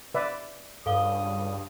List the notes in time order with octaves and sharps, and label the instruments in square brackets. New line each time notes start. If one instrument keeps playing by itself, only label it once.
[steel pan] B4 D5 E5
[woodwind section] C#2 D#6 [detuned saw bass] G2 [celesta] A4 F5 G7